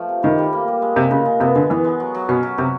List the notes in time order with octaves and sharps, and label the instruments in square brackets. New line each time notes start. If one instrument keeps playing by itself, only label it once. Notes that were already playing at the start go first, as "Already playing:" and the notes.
Already playing: [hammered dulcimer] F3 A3
C3
[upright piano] D#3 [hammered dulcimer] G3
[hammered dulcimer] G3
A#3
G3
G#3
[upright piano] C3 [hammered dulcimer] G#3
[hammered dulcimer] A#2 [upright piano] C#3
[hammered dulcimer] G#3
[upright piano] C3 [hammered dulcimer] B3
[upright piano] D3 [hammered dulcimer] G#3
[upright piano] E3 [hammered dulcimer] B3
[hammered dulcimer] G#3
F#3
F#3
[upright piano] B2 [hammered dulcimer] C#4
[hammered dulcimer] F#3
[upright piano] C3 [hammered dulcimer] F#3